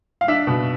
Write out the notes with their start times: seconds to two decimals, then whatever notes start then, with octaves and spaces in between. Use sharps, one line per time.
0.21 F5
0.28 D4 E5
0.47 B2